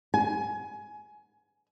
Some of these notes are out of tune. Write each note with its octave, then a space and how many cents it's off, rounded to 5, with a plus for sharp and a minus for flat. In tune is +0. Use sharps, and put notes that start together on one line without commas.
G#5 +20